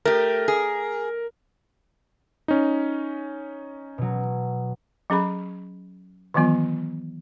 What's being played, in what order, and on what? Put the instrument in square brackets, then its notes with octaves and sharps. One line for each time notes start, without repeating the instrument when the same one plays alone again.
[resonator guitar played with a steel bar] A3 G4 [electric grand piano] A#4
[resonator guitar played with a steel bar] G#4
[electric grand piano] C#4 D#4
[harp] B2 F#3
[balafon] F#3 C#4 G#4 B5
D#3 E3 F#3 B3 F4